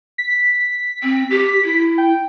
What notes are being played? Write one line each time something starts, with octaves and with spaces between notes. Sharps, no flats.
B6
C4
G4
E4
G5